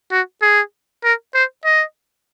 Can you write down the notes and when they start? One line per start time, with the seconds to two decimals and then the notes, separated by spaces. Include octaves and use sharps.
0.11 F#4
0.42 G#4
1.04 A#4
1.34 C5
1.65 D#5